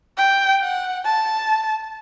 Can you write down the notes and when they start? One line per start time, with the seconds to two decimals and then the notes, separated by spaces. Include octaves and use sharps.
0.18 G5
0.61 F#5
1.05 A5